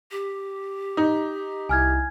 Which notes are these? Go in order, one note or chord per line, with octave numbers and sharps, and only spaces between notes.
G4
D#4
C2 E4 G#5 F6 G#6